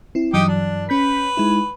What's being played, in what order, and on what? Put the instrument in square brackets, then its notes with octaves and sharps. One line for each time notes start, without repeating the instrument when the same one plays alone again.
[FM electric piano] C4 E4
[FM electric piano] G2 E3 F#3 [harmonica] D#4 G4
[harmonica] D4
[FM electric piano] C#4 G6 B6 [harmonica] B4
[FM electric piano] G#3 D#4 E4